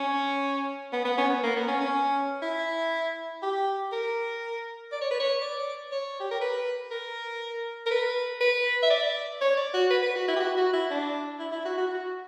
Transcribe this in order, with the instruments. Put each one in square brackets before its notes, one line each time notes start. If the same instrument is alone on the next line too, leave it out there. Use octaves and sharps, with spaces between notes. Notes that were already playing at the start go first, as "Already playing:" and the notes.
Already playing: [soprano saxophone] C#4
B3
B3
C#4
B3
A#3
B3
C#4
C#4
E4
G4
A#4
D5
C#5
B4
C#5
D5
C#5
G4
A#4
B4
A#4
A#4
B4
B4
E5
D5
C#5
D5
F#4
B4
B4
F#4
E4
G4
F#4
F#4
E4
D4
E4
E4
F#4
F#4
F#4